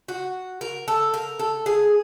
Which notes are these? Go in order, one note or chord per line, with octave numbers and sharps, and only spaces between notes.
F#4
A#4
A4
A#4
A4
G#4